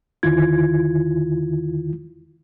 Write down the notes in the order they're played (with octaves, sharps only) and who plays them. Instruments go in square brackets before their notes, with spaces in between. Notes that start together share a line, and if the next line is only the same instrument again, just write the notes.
[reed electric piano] E2 D3 D#3 E4 F4 G#6